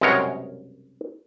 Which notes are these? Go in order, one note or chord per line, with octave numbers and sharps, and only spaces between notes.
C2 F#2 B2 G#3 A#4 C#5